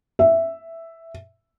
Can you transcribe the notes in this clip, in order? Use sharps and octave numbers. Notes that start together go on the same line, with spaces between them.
E5